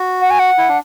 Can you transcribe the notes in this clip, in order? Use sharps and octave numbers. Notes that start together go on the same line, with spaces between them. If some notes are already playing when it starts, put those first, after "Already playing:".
Already playing: F#4
F#5
G#5
F#5
E4
D4